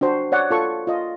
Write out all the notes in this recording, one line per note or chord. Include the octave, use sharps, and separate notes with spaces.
D4 F#4 C5
C#5 D5 F#5
F4 A4 C#6
F4 D#5